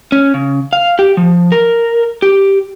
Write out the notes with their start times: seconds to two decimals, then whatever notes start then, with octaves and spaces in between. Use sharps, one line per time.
0.12 C#4
0.34 C#3
0.73 F5
0.99 G4
1.17 F3
1.52 A#4
2.22 G4